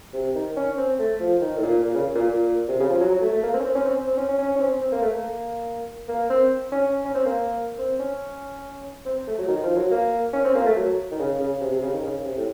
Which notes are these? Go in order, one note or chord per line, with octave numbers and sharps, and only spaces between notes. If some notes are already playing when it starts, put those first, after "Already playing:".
C3
D#3
C#4
C4
A3
F3
D#3
A2
A#2
A#2
C#3
A#2
A#2
C3
C#3
F3
F#3
F#3
A3
A3
A#3
C4
C#4
C4
C#4
C4
C4
C#4
C#4
C#4
C#4
C4
C4
A#3
A3
A#3
A#3
C4
C#4
C#4
C4
A#3
C4
C#4
C4
A3
F#3
D#3
F3
F#3
A#3
C#4
C4
A#3
A3
F#3
D#3
C#3
C#3
C3
C3
C#3
D#3
C#3
C3
A2